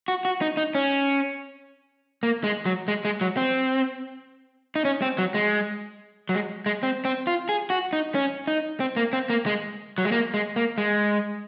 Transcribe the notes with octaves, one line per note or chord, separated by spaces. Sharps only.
F#4
F#4
D#4
D#4
C#4
A#3
G#3
F#3
G#3
G#3
F#3
C4
D#4
C#4
C4
F#3
G#3
F#3
G#3
G#3
C4
C4
F4
G#4
F#4
D#4
C#4
D#4
C4
A#3
C4
A#3
G#3
F#3
G#3
A#3
G#3
A#3
G#3